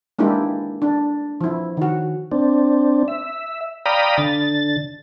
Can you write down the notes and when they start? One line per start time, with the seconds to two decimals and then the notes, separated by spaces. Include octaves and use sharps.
0.19 G#3 A#3 D4 E4 G4
0.82 D4
1.41 F3 E4
1.77 D#3 F#4
2.32 C4 D4
3.08 E5
3.86 D5 F5 G5 A#5 B5 D#6
4.18 D3 A6